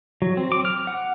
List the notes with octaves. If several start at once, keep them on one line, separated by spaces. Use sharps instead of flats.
F#3
C4
D6
F6
F#5